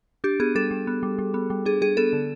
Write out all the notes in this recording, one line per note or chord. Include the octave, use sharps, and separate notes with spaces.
D4 G4
B3 G#4
G3 A4
G3
B3
G3
G3
B3
G3
D4 G#4
G3 G#4
B3 A4
D3